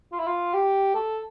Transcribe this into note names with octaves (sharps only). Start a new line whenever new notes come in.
F4
E4
F4
G4
A4